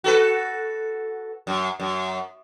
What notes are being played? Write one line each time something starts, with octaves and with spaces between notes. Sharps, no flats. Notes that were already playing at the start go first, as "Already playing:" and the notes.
F#4 A4 B4
F#2
F#2